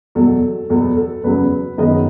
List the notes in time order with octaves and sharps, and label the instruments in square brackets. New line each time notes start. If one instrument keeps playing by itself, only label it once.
[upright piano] E2 B2 F#3 A4
E2 B2 F#3 B3 A4
A4
E2 C#3 F#3 B3 B4
F#2 D#3 G#3 B3 D#5